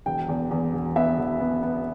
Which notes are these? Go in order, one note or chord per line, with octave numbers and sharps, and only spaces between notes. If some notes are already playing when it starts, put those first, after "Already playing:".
E1 G5
E2
E2
E1
B3 E5
E1
B3
B3